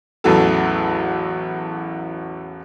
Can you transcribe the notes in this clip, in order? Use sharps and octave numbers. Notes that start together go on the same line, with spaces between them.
A1 E2 F#3 A4